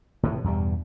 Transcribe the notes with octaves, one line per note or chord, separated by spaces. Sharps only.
A2 C3 E3
E2 G2 B2 G3